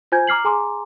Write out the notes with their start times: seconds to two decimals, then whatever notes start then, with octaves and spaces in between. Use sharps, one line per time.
0.12 F4 C5 G#5 G6 G#6
0.27 A#5 D6 F6 C7 F#7
0.45 G#4 G#5 A#5 C6 D6